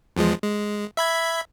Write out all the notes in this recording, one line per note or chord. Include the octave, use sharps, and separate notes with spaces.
E2 F3 G#3
G#3
E5 B5 G#6